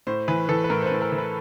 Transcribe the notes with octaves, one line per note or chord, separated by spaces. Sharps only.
A2 C5
E3 B4
E3 A4
B4
A2 A#4
C5
B4
A2
A#4
E3
B4